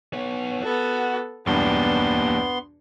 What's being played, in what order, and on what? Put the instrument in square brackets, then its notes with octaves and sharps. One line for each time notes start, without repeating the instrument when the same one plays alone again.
[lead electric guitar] B3 C#5
[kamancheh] B3 A4 [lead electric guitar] F#4
[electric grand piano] B1 E2 G2 [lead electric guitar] A#3 G4 [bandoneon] B3 C6 [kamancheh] D4